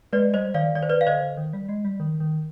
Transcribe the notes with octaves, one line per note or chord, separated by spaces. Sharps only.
G#3 B4 D5
G3 C5 D#5
D#3 D5 F5
D#3 D5
C5
B4 D5
F5
D3 C5 D#5
D#3
G3
G#3
G3
D#3
D#3